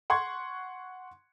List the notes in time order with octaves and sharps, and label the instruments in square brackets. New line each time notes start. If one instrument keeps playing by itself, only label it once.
[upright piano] F#5 C6 C#6 G#6